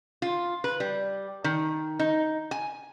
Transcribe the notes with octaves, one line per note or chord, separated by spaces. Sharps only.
F4
B4
G3
D#3
D#4
G#5